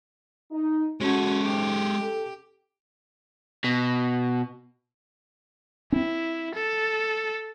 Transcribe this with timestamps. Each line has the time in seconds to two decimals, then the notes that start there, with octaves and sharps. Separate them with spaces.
0.51 D#4
1.01 G#3 C#4 F#4 A4
1.44 G#2 G4
2.01 A4
3.64 B2
5.92 C4 C#4 E4
6.55 A4